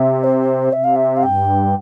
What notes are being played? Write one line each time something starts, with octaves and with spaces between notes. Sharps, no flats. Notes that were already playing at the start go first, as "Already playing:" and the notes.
Already playing: C3 E5
C5
C3 E5
F5
E5
F5
G2 G5